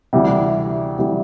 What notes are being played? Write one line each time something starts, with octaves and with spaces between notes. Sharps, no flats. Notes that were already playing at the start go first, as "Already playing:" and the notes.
D2 C3 E3 G3
D2 C3 E3 G3